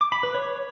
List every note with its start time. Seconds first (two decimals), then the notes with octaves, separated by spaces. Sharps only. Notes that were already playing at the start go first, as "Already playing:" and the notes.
0.01 D6
0.12 B5
0.23 B4
0.34 C#5